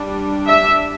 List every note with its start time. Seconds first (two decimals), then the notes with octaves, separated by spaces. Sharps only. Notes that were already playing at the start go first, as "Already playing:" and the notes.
Already playing: G3 D4
0.47 E5